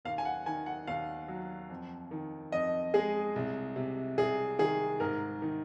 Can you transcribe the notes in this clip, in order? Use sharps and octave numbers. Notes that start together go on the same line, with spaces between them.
D#2 F5
G#5
F#5
D#3 G#5
F#5
D#2 F5
F#3
F2
D#3
F2 D#5
G#3 G#4
C2
C3
C2 G#4
D#3 G#4
G#2 A#4
D#3